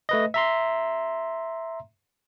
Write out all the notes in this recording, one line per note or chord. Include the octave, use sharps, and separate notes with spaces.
A3 B4 D#5
E5 A#5 C6